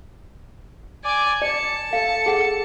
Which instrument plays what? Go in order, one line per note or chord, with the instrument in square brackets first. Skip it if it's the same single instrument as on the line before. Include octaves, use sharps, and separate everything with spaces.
[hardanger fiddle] D5 G#5 [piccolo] D6
[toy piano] D5 [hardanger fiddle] A5 [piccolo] C#7
[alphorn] A4 [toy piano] F5 [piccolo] C#7
[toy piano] G#4 F#5